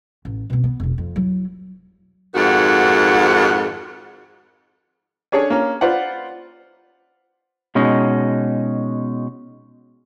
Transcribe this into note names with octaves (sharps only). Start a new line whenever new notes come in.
A1
B2 C4
B3
F1 B1
F2
F#3 E4
F2 G#2 D#3 F#4 F#5
C#4 D4 G#4 A4 C#5
A#3 C#4
F4 B4 C5 D5 F#5
B2 G#3 C#4 D#4